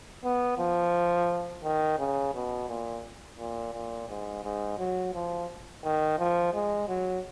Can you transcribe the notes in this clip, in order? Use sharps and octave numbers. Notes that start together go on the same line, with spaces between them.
B3
F3
D#3
C#3
B2
A#2
A#2
A#2
G#2
G#2
F#3
F3
D#3
F3
G#3
F#3